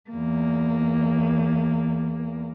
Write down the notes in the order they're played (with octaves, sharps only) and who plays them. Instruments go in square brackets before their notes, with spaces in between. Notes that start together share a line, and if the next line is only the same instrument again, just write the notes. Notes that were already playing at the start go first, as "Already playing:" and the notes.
[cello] E2 A#3